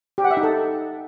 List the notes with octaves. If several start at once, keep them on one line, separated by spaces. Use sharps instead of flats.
G4
F#5
E5
D#4
A4